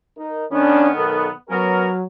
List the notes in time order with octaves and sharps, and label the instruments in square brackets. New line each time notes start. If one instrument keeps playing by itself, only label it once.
[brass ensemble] D#4 A#4
[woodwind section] D#3 B3 [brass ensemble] C#4 D4
[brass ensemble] B1 A4 A#4
[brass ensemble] F#3 [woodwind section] B3 C#4 A#4